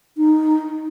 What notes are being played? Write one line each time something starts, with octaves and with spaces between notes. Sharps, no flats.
D#4